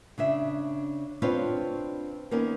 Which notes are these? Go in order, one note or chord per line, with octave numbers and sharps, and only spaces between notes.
C#3 D4 E5
C4 D4 F4 B4 C#5
D#3 A#3 B3 C#4 D#4 A#4